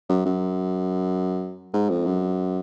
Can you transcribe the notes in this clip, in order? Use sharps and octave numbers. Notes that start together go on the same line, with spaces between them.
F#2
F#2
G#2
F2
F#2